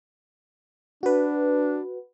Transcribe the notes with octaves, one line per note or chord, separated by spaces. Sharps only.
D4 F#4 B4